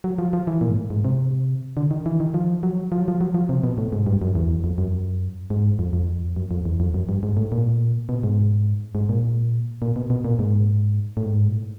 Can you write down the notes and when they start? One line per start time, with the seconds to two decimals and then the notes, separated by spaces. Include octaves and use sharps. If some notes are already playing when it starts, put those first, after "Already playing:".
0.04 F#3
0.18 F3
0.33 F3
0.47 E3
0.61 A#2
0.70 G#2
0.77 A2
0.90 G#2
1.05 C3
1.77 D3
1.91 D#3
2.06 E3
2.20 D#3
2.34 F3
2.63 F#3
2.92 F3
3.00 F#3
3.08 F3
3.21 F#3
3.34 F3
3.49 C3
3.64 B2
3.78 A2
3.93 G#2
4.07 G2
4.22 F#2
4.35 E2
4.64 F2
4.78 F#2
5.50 G#2
5.79 F2
5.93 F2
6.36 F#2
6.51 F2
6.65 E2
6.80 F2
6.94 F#2
7.09 G2
7.23 G#2
7.37 A2
7.52 A#2
8.09 B2
8.23 G#2
8.95 G#2
9.09 A#2
9.82 A#2
9.96 B2
10.10 B2
10.25 A#2
10.39 G#2
11.17 A2
11.25 G#2
11.48 A#2
11.54 A2